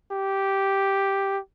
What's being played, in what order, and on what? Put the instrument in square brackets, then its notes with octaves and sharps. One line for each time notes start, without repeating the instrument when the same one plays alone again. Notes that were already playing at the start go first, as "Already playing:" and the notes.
[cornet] G4